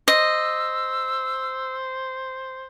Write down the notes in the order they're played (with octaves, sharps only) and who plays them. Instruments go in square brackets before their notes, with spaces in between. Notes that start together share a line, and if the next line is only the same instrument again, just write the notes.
[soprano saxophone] C5 [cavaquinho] D#5 [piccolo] E6